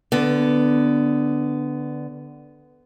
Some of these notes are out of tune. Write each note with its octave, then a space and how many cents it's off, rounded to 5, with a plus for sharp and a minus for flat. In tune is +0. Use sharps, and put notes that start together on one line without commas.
D3 +0 B3 +10